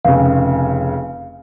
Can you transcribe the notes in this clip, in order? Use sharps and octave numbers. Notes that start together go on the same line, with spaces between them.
F1 C#3 F5